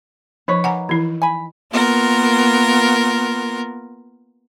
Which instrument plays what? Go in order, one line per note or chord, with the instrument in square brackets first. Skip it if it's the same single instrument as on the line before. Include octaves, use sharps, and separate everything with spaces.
[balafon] F3 [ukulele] D#4 B4 C#5
[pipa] A#3 [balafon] F#5 G#5 A#5
[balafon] E3 E4
[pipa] G#5 B5
[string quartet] A#3 B3 F4 A#4